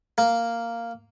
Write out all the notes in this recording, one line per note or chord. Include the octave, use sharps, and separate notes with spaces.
A#3